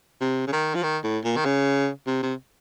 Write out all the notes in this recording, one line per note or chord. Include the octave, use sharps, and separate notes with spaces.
C3
C#3
D#3
F3
D#3
A2
A#2
D#3
C#3
C3
C3